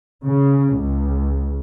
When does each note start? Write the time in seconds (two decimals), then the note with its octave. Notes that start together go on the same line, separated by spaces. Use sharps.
0.22 C#3
0.76 C#2